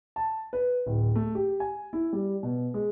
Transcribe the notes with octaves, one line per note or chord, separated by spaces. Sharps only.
A5
B4
D1
A3
G4
G#5
E4
G3
B2
G#3